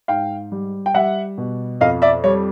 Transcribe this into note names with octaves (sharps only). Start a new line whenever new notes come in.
G#2 F5 G5
G3
G5
G3 E5 F#5
B2
F2 D#5 F5
D5 E5
G3 C#5